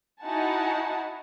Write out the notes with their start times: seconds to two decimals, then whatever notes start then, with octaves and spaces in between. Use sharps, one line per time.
0.23 D#4 E4 F#4 F#5 G#5 A5